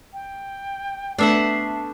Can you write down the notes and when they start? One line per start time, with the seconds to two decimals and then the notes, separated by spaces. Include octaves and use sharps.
0.13 G5
1.18 A3 B3 D4 E5 F#5 C7